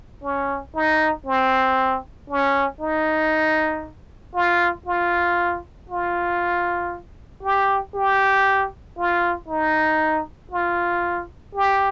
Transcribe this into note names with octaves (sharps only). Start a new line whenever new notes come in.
C#4
D#4
C4
C#4
D#4
F4
F4
F4
G4
G4
F4
D#4
F4
G4